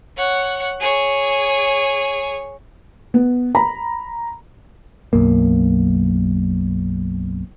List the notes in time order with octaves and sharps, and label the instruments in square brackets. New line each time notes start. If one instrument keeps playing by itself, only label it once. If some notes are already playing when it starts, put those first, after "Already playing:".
[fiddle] C#5 F#5
G#4 C#5
[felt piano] B3
A#5 B5
[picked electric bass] B1 F#2 A#3